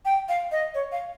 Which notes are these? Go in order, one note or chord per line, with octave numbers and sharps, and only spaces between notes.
G5
F5
D#5
C#5
F5